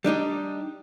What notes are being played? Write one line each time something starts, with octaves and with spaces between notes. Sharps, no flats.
G3 D4 D#4 G4